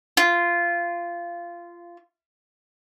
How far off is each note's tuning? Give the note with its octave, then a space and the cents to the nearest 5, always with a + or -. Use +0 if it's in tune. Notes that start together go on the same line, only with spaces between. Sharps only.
F4 -15